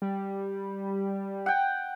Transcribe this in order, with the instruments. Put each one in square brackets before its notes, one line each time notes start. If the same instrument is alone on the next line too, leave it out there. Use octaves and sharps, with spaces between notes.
[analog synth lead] G3
[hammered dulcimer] F#5 G5